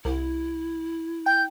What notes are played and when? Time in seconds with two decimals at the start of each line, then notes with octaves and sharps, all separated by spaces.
0.05 C2 E4
1.26 G5 G6